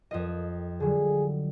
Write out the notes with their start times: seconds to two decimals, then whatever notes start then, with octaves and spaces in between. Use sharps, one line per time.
0.11 F2 F4 D#5
0.80 D3 F#3 G3 G#4